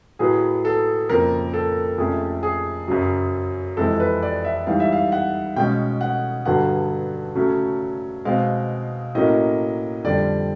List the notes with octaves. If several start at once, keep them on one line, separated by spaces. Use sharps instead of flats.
A2 F#3 B3 G#4
A4
F2 C#3 F3 A#3 A#4
A4
F2 C3 F3 A3 C#4 G#4
G#4
F#2 C#3 F#3
F2 C3 E3 G#3 A4
B4
D5
E5
G#2 E3 G3 F5
E5
F5
F#5
B2 G#3 C#4 G5
F#5
G2 D3 F#3 B3 F#5
C#3 F#3 A3 C#4
B2 G#3 C4 F5
A2 F#3 A#3 C#4 D#5
F2 D3 G3 D5